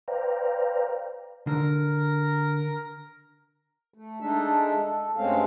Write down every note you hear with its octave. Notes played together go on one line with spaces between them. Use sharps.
B4 C5 D5 F5 G5 A#5
D3 A#4
A3
G#3 D4 D#4 A4 E5
A4
G2 G#3 A3 C4 C#4 F5